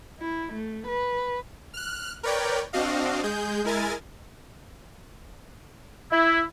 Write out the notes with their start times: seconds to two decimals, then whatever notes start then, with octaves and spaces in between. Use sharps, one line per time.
0.19 E4
0.53 A3
0.87 B4
1.73 F6 F#6
2.23 A#4 B4 C#5 D5 G5
2.73 C4 D4 F#4 D#5 F5
3.23 G#3 G#4 G6
3.64 G#3 E4 A#4 G#5 A6
6.12 E4